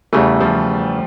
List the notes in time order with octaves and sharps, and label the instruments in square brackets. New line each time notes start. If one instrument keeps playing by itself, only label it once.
[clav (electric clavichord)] E2 C#3 E3 [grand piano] G3 A3
[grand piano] F3 G3